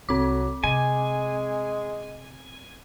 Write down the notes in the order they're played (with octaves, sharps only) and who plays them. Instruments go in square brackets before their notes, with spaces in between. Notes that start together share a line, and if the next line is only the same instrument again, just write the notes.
[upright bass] C2 [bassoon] F#3 [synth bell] C4 D6
[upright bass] C3 [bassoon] G#3 [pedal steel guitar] G#5